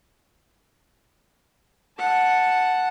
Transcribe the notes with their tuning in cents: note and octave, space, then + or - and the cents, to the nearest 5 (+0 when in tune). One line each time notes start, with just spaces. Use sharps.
F#5 -5 A5 +0